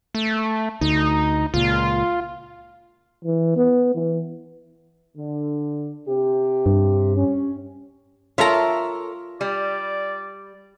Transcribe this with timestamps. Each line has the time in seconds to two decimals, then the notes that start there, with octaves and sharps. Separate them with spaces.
0.15 A3
0.81 D2 D#4
1.54 C#2 A#2 F4
3.25 E3
3.56 B3
3.95 E3
5.16 D3
6.08 C3 G4
6.66 G2
7.17 C#4
8.38 F4 A4 A#4 C#5 E5 A#5
9.41 G3 D5